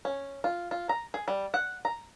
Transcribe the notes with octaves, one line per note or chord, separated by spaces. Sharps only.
C#4
F4
F4
A#5
G#4
G3
F#5
A#5